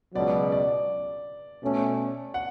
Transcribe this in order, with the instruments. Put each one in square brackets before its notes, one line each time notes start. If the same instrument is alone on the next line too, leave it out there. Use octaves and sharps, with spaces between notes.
[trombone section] C#2 B2 F#3 [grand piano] D5
[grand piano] D5
[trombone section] B2 A3 C#4
[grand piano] F#5